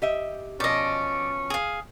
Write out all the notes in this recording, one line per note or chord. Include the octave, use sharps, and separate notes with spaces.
G4 D#5 E5
B2 F3 C#4 D5 D#5
G#4 F5